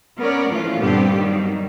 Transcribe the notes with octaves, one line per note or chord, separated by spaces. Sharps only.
B3 C#4 A#4 C#5 D5
E3 F3 A3 C#4 F4
G2 A#2 D3 B3 C4 G4
D#3 F#3 G3